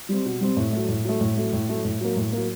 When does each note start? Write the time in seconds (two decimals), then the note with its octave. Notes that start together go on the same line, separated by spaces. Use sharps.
0.09 G3 C4
0.25 B2
0.41 G3 C4
0.57 A2
0.73 F#3 A3
0.89 A2
1.05 F#3 A3
1.21 A2
1.37 F#3 A3
1.53 A2
1.69 F#3 A3
1.85 A2
2.01 F#3 A#3
2.17 A2
2.32 F#3 A#3